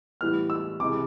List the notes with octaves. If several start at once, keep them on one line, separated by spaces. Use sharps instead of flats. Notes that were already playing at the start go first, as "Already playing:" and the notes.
A2 E3 G3 B3 F6
E6
C#2 C3 E3 G#3 D6